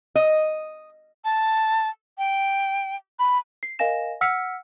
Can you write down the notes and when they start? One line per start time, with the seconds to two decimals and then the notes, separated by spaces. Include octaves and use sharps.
0.15 D#5
1.25 A5
2.18 G5
3.19 B5
3.63 C7
3.79 A#4 D#5 F5 G#5 A#6 E7
4.21 F#5 E6 F6 B6 C#7